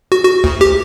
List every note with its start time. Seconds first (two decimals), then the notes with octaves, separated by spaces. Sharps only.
0.12 F#4
0.24 F#4
0.44 D2
0.61 G4